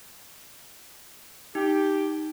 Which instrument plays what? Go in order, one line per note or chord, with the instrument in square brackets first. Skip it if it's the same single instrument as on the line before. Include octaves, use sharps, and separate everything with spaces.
[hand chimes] D#4 [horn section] G4